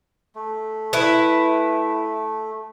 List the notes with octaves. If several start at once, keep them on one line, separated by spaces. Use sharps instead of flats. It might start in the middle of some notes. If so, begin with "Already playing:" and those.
A3
E4 B4